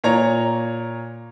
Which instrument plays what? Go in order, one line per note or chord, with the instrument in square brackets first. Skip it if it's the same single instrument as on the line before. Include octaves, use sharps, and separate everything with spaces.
[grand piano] A#2 C#5 A#5